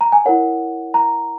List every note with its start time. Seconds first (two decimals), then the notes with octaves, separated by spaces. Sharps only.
0.01 A#5
0.12 G#5
0.26 E4 A#4 C#5 F#5
0.94 A#5